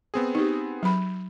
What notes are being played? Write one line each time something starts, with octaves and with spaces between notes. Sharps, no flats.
B3 C4 G#4
D#4 G4
F#3 B5